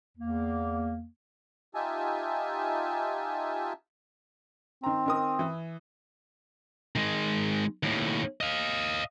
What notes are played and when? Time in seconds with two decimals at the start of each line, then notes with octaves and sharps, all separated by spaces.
0.18 E2 A#3
1.74 D#4 F4 G4 E5 G#5 A5
4.84 D#3 C4 A#5
5.06 D#3 A#4 D#6
5.39 E3
6.96 D#3 G#3
7.83 D#2 A2
8.41 D#5 F5